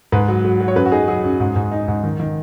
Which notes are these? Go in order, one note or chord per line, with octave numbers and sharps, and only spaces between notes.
G#2 B4
F#3
F#3
F#3
C#5
F#2 B4
F#4
D#4 G#4
F#3 G#4
F#2
G#2
G#2
D#4
G#2
D#3
D#3